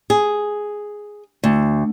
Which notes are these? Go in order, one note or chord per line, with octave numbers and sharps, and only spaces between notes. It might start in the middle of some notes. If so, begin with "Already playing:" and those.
G#4
D2